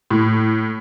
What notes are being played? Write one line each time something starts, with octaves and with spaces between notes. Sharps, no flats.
A2